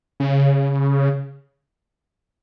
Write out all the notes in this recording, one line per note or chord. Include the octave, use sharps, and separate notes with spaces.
C#3